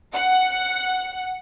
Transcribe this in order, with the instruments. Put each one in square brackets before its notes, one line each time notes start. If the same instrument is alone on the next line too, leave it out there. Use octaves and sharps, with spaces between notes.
[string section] F#5